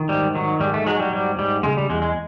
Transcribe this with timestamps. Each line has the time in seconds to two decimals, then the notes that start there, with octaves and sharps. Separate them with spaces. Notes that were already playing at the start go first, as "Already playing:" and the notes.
Already playing: D#3
0.09 G#2 G3
0.35 D#3 F#3
0.60 G#2 G3
0.74 A3
0.87 F#3 G#3
1.00 G3
1.12 G#2 G3
1.38 G#2 G3
1.63 C#3 G#3
1.77 G3
1.90 E2 G#3
2.02 G#3